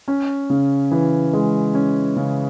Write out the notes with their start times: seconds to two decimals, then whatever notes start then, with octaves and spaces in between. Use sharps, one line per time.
0.08 C#4
0.50 C#3
0.91 E3
1.33 G#3
1.75 C#4
2.16 C#3